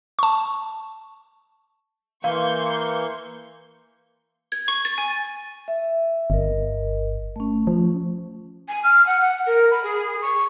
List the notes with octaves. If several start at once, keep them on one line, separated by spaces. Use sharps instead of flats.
A5 C#6
E3 A#3 F5 C6 C#6 G6
G#6
C#6
A6
G#5
E5
G1 A#4 D#5
A3 C#4
F3
G#5
F6
F#5
F#5
A#4
B5
G#4
C#6